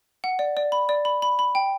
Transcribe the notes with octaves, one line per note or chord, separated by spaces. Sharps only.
F#5
D5
D5
B5
D5
B5
B5
B5
G5